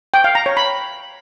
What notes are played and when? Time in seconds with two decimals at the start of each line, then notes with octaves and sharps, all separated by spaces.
0.14 G5
0.24 F5
0.35 A#5
0.46 C#5
0.57 B5